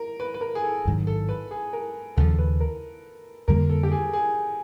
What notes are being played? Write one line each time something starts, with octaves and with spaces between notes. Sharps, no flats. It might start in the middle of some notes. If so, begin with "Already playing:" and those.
Already playing: A#4
B4
B4
A#4
G#4
A4
A1 G#2 D#3 F#3
A4
B4
G#4
A#4
D#2 C#3 F3 A4
B4
A#4
F2 D3 G3 A#3 A#4
A4
G4
G#4
G#4